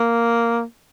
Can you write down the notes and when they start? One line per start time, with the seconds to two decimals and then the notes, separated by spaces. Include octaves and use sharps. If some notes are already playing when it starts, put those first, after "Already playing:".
Already playing: A#3